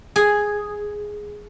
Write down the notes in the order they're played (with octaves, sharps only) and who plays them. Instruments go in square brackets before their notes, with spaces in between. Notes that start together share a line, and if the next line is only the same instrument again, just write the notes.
[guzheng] G#4